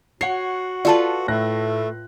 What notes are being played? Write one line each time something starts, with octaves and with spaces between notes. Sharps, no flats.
F#4 C#5 F#5 C7
F4 A4 B4 D5 A5
A2 A3 F#6 A#6